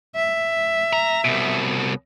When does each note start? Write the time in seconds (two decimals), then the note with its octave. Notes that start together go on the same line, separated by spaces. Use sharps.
0.16 E5
0.93 A#5
1.25 C2 B2